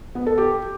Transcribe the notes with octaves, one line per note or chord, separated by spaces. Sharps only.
B3
A4
G4